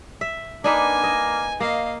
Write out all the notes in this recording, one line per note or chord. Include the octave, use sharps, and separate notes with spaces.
E5
A#3 D4 D#4 B4 G#5
D#5
A#3 D#5 F5